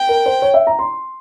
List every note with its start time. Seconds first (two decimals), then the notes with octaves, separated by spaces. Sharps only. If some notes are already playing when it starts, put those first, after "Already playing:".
Already playing: G5
0.09 A#4
0.26 C5
0.42 C#5
0.54 E5
0.67 A#5
0.79 C6